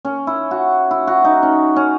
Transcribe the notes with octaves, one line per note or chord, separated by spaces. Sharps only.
C#4
E4
F#4
E4
F#4
D#4
C#4
C#4